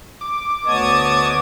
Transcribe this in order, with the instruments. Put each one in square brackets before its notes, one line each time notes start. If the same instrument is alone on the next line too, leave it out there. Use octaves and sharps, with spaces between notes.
[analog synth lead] D6
[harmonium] D2 D#5 [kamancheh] B3 C#5 [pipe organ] A5 D#6 G#6